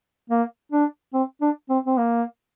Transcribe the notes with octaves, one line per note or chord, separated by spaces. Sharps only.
A#3
D4
C4
D4
C4
C4
A#3